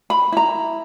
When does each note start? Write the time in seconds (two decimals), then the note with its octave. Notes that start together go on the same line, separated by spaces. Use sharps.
0.10 B5
0.32 E4 A#5